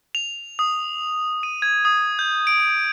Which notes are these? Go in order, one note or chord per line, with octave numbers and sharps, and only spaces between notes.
F7
D#6
D#7
G#6
D#6
G6
D7